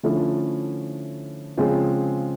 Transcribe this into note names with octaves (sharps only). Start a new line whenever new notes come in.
D3 F3 A3 C#4 E4
C#3 F3 G#3 C4 F4